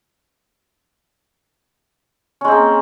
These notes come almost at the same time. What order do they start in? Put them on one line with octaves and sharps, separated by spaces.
C#4 G#3 C4 A#3